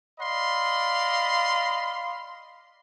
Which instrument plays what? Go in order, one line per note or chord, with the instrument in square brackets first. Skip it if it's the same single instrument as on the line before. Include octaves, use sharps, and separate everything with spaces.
[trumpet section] D5 D#5 F5 B5 C6